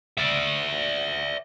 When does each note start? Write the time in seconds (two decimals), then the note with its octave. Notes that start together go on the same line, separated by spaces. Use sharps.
0.18 D5 E5